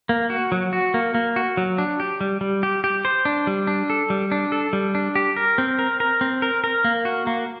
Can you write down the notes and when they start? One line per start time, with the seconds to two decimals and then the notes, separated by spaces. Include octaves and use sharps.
0.09 A#3
0.30 F#4
0.52 F#3
0.73 F#4
0.94 A#3
1.15 A#3
1.36 F#4
1.57 F#3
1.78 D4
2.00 G4
2.21 G3
2.41 G3
2.63 G4
2.84 G4
3.05 C5
3.25 D4
3.47 G3
3.67 D4
3.90 A4
4.10 G3
4.32 D4
4.52 A4
4.73 G3
4.95 D4
5.15 G4
5.36 A#4
5.58 C4
5.79 A#4
6.00 A#4
6.21 C4
6.42 A#4
6.64 A#4
6.84 A#3
7.05 F#4
7.27 A#3